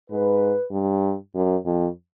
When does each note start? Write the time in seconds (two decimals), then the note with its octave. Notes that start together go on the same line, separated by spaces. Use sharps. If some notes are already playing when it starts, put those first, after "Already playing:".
0.10 G#2 B4
0.71 G2
1.35 F#2
1.65 F2